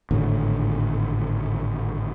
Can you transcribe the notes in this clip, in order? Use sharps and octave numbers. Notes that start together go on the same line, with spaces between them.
G#1 A2 D3